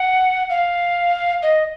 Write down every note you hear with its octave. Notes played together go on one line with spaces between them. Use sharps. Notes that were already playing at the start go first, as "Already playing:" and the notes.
Already playing: F#5
F5
D#5